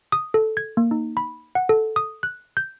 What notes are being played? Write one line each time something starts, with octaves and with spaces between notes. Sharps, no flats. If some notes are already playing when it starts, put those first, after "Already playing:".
D#6
A4
G#6
A#3
D#4
B5
F#5
A4
D#6
F#6
G6